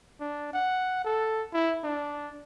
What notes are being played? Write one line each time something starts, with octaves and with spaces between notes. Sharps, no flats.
D4
F#5
A4
E4
D4